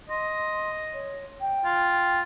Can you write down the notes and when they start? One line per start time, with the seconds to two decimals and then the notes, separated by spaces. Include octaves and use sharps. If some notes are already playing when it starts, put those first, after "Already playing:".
0.10 D#5 C6
0.94 C#5
1.41 G5
1.65 F4